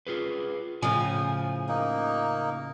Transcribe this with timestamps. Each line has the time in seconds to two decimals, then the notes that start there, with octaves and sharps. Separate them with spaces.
0.07 F4 G#4 B4
0.82 A2 C#3 F3 G#5
1.69 A#3 D#4